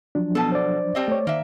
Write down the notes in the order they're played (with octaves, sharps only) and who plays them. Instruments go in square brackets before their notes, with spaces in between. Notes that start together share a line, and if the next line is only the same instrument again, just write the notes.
[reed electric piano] F3 F#3 D4
[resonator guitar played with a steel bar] B2 A4 [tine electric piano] B3
[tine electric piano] C5 D5
[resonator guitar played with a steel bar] G3 C4 D#5
[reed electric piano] A3 C#5
[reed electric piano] D#3 [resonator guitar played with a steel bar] A#3 E5